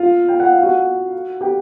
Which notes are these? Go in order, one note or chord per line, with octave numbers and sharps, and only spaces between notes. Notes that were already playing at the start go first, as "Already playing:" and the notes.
Already playing: F4 F5
G5
F#5
F5
F#4 F#5
G4 G5